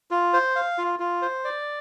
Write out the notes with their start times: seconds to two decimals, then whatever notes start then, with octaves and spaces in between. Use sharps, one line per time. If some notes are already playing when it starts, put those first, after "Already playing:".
0.11 F4
0.33 C5
0.56 F5
0.78 F4
1.00 F4
1.22 C5
1.45 D5